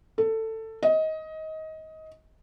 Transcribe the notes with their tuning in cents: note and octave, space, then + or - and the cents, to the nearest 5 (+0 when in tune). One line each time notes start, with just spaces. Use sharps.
A4 +15
D#5 +20